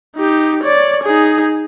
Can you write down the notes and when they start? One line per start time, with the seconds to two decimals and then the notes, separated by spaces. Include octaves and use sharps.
0.16 D#4 G4
0.64 C#5 D5
1.04 D#4 G#4